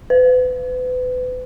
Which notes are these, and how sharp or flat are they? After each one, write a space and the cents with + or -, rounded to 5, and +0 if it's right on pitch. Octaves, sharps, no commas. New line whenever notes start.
B4 +35